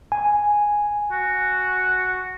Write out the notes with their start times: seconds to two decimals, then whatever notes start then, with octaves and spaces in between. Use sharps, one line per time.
0.12 G#5
1.12 F#4